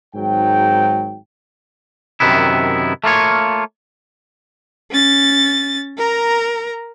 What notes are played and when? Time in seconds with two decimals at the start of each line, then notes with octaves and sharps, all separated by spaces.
0.15 G#1 G#2 F#3 G5
2.20 F#2 A2 C3 D#3 B3 E4
3.04 A3 A#3 F4 C#5
4.91 C#4 A6
5.97 A#4 A#5